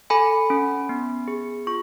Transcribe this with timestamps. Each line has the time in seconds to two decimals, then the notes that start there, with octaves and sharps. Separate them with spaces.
0.10 A4 G#5 B5
0.50 C#4
0.89 B3
1.28 G#4
1.67 F4 C#6